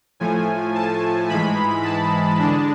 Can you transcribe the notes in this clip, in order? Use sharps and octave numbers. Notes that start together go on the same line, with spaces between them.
A2 F3 A3 G#5
A5
G#2 E3 G#3 B5
A5
D3 G#3 D4